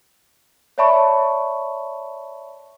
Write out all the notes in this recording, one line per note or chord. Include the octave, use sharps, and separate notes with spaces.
C#5 D5 E5 A5 B5 C#6